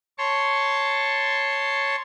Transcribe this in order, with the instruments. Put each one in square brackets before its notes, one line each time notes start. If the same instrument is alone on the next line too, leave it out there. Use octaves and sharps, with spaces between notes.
[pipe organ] C#5 A5 C6 C#6